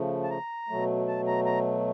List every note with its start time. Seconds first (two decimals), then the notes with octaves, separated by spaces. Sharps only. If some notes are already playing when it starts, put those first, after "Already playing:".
Already playing: C#3 F3 A3
0.24 A5
0.30 A#5
0.69 B2 F#3 A3
1.08 A5
1.27 A#5
1.46 A#5